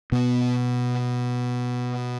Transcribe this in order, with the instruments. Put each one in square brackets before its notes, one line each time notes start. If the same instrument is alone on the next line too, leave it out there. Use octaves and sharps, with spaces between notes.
[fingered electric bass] B2 B3